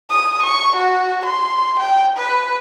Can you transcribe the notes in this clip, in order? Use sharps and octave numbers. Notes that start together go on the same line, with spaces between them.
D#6
C#6
F#4
C6
G5
B4